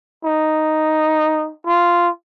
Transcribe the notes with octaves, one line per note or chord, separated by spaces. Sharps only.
D#4
F4